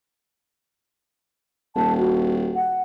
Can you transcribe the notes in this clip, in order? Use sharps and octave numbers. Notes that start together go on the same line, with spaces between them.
D#1 A5
F#4
F#5